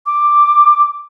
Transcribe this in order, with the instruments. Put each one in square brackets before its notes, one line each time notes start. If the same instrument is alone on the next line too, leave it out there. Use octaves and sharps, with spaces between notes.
[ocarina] D6